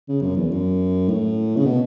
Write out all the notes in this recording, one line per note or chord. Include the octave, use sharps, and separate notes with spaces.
C#3
F#2
E2
F#2
A2
C#3
B2